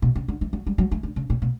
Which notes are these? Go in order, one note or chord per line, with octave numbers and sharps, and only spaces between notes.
B2
C#3
D3
E3
F#3
G3
F#3
E3
D3
C#3
A#2
B2